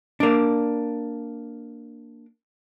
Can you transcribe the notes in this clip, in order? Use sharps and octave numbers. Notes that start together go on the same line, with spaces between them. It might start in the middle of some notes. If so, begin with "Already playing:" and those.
A#3 D4